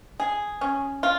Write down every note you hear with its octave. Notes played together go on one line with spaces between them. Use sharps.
G#4
C#4
F4